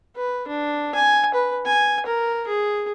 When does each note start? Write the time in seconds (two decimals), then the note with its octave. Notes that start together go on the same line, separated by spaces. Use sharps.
0.16 B4
0.48 D4
0.95 G#5
1.34 B4
1.66 G#5
2.06 A#4
2.47 G#4